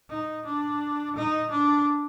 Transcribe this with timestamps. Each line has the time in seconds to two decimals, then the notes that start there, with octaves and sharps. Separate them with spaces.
0.10 D#4
0.46 D4
1.16 D#4
1.51 D4